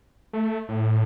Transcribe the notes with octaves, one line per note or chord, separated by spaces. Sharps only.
A3
A2